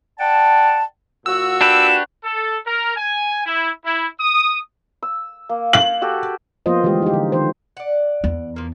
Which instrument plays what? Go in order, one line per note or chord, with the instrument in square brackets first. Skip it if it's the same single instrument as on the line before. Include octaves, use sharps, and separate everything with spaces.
[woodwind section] D5 F#5 G5 A5
[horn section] A#2 F#4 [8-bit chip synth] E6
[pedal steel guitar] D4 G4 B4 [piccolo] E7
[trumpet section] A4
A#4
G#5
E4
E4
D#6
[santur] E6
A#3
[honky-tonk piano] F#7
[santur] F#4 G4 A4
[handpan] F3 A#3 B3 F4 C5 D#5
D3 E3 G3 G#3 G4
D#4 G4
D3
D#3 C5
[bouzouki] D5 F#5
[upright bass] E2
[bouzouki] F3 A#3